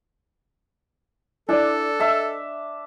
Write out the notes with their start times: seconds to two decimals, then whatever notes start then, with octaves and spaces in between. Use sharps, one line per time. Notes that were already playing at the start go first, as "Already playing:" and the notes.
1.49 D4 E4 A4 D5
2.00 D#5 E5 A5